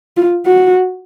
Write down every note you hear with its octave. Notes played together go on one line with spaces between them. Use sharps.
F4
F#4